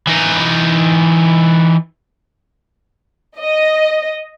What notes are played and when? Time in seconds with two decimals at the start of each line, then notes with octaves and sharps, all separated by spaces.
0.07 E3 D#4
3.38 D#5